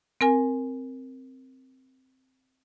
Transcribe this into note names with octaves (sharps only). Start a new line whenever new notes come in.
C4 A#4 G#5